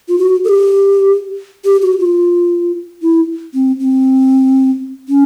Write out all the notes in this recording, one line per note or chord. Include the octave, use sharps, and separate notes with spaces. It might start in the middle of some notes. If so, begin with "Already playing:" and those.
F4
F#4
A4
G4
G4
F#4
F4
E4
C4
C4
C#4